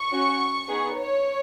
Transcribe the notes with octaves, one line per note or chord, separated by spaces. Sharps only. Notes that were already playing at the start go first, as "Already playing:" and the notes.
Already playing: C#6
C#4 F#4
B3 D#4 G#4
C#5